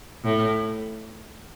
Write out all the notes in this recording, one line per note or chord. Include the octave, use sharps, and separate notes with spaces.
A2